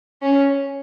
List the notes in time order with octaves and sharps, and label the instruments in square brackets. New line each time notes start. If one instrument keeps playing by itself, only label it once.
[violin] C#4